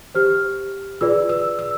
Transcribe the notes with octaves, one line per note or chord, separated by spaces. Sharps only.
G4 C5 F6
F4 G#4 B4 D5 E6
E6
E6